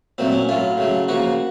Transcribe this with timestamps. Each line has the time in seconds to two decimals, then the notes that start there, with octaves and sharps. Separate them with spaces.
0.18 A#2 F#3 A3 C4
0.33 C#4
0.49 A2 F#3 A3 F4
0.78 C#3 F#3 A3
1.08 C#3 F3 A#3 F#4